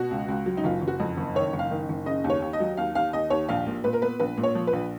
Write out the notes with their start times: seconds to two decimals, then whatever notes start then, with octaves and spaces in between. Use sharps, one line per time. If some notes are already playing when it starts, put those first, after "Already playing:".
Already playing: B2 F#4
0.11 C#2
0.28 C#2
0.46 F#3
0.57 D#4
0.64 F#1 F4
0.82 F#1
0.88 F#4
1.00 F2
1.17 F#1
1.35 D#3 C#5
1.53 F#1
1.59 F5
1.71 D#3
1.89 F#1
2.06 C#3 D#5
2.24 D#2
2.30 C#5
2.42 D#2
2.53 D#5
2.60 F#3
2.77 D#2 F5
2.95 D#2 F5
3.13 D#2 D#5
3.30 D#2 C#5
3.49 A#1 F5
3.67 A#2
3.84 A#2 B4
3.93 A#4
4.02 B3 B4
4.20 A#1 B4
4.37 A#2
4.43 C#5
4.55 F3
4.67 B4
4.73 A#1